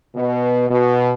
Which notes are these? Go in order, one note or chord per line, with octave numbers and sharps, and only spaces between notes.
B2
B2